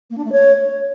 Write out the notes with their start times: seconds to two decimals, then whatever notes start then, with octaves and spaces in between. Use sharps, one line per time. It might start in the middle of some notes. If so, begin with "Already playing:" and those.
0.10 A#3
0.18 D4
0.25 A3
0.32 C#5